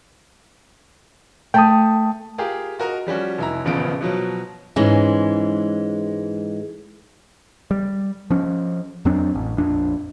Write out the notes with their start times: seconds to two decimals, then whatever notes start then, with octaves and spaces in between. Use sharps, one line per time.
1.54 A3 G5 A5 D#6
2.38 F4 G4 G#4 A#4
2.79 F4 F#4 A#4 D#5 A#5
3.07 F3 G3 C#4 F#4
3.38 F1 E4 A#5
3.65 D#1 A1 C#3 F3 B3 D7
4.01 B2 F3 F#3
4.76 G#2 E3 G#3 C#4
7.71 G3
8.30 F3 C#4
9.05 F2 F#3 C4 D4
9.35 A1
9.58 A#1 F2 D4